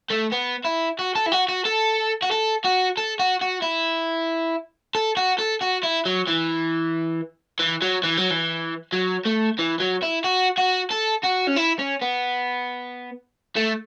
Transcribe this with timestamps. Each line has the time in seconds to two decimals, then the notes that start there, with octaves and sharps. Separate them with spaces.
0.11 A3
0.32 B3
0.65 E4
0.99 F#4
1.15 A4
1.26 E4
1.32 F#4
1.48 F#4
1.65 A4
2.22 F#4
2.31 A4
2.64 F#4
2.97 A4
3.19 F#4
3.42 F#4
3.62 E4
4.95 A4
5.17 F#4
5.39 A4
5.62 F#4
5.84 E4
6.06 F#3
6.27 E3
7.60 E3
7.82 F#3
8.04 E3
8.17 F#3
8.31 E3
8.92 F#3
9.25 A3
9.59 E3
9.80 F#3
10.02 E4
10.24 F#4
10.58 F#4
10.91 A4
11.23 F#4
11.47 C#4
11.56 E4
11.79 C#4
12.01 B3
13.56 A3